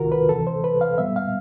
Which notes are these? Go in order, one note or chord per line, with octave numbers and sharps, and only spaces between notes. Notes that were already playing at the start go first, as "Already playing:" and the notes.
Already playing: C2 C3 D#3 F4 F#4 A#4
B4
D2 C3 E3 A4
C5
B4
F5
A#2 G3 B3 E5
F5